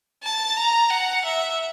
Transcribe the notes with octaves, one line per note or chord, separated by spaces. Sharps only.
A5
A#5
F#5
E5